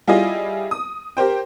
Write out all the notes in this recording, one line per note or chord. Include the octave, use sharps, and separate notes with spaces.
G3 E4 F4 G#4 D#5
D#6
G4 A#4 C5 G5